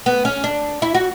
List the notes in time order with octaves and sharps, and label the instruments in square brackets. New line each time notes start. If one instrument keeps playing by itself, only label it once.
[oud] B3
C#4
D4
E4
F#4